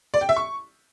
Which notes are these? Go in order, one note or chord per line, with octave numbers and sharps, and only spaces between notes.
D5
G5
E5
C#6